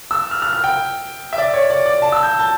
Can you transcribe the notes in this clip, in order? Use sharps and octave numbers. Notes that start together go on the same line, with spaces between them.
E6
F6
F6
F6
G5
E5
D5
C#5
D5
D5
A5
E6
G6
A5